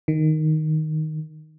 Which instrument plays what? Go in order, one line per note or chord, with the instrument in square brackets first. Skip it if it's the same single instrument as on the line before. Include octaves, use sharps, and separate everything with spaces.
[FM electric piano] D#3